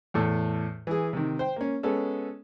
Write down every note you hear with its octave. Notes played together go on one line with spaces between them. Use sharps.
E2 A2 A4
E3 G#4
C3 D#3
C5 G5
A#3 C#4
G#3 B3 C#4 A4